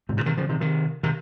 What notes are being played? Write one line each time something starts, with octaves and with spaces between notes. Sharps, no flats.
G#2 C3
A#2 C#3
C3 D#3
C#3 F3
C3 D#3
C3 D#3
C3 D#3